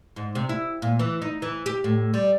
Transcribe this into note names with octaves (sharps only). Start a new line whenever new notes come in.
G#2
C3
E4
A#2
E3
D#4
E3
G4
A2
G3